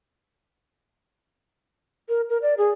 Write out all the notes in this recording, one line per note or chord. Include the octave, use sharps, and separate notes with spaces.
A#4
A#4
D5
G#4